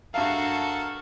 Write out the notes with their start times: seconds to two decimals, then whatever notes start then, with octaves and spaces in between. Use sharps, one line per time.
0.14 G2 F#4 A4 A#4 E5 F5 A5